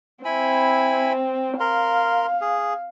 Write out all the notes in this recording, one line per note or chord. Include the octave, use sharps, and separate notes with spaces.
C4 E4 G#5 B5
A#4 F5 C6
G#4